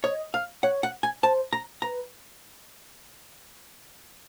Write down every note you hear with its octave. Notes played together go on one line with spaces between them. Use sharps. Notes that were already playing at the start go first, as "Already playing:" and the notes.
C#5 D#5
F5
C#5 F#5
F#5
G#5
C5 A5
A#5
B4 A#5